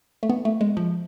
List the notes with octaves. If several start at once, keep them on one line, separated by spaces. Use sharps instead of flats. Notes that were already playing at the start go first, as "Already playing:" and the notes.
A3
B3
A3
G#3
F3